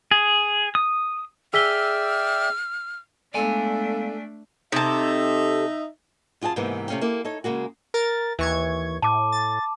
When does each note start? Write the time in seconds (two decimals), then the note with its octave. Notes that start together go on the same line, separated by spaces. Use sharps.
0.11 G#4
0.75 D#6
1.54 G#4 D5 E5 G5 E6 F6 B6 G7
3.34 G#3 A3 B3 D4 A4 D5 F5 G#5
4.72 C3 D#4 A4 E5
6.41 F#2 F4 G#4 G5 A5
6.56 G#2 C3 E3 G#3 A#3 B3
6.88 C3 A3 C#4 F5 G5
7.01 A#3 E4 G4 A4
7.25 D#4 A4 C#5
7.44 C#3 G#3 A#3 F#4
7.94 A#4 A6
8.39 D#2 E3 C#6 G#6
9.02 A2 A5 D6
9.32 A6